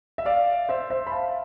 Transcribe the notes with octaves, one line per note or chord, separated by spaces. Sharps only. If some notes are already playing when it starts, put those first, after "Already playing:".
E5
D5 F5
C5 E5
C5 E5
B5
F5 A5